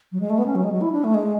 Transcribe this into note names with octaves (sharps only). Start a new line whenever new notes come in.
F#3
G#3
A3
B3
C#4
F#3
G#3
F#3
E4
D4
A3
G#3